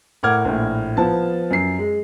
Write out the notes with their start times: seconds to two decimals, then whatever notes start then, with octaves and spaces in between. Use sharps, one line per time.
0.23 A2 A#4 F#5 D6 F6 G#6
0.45 A#1 A2
0.97 F3 B3 A5
1.51 F#2 C7
1.79 G#3